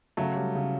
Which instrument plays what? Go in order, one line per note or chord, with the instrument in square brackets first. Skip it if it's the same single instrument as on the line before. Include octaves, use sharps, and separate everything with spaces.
[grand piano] C#3 [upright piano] F#3 A3
[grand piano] G3
C#3